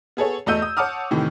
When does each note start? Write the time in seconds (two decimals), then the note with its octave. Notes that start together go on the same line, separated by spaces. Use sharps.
0.17 B3 G#4 A4 C#5
0.46 E2 A3 D#5 E6 G6 D#7
0.62 D#6
0.77 C#5 F#5 A5 D6 D#6 F6
1.11 A2 C3 D#3 E3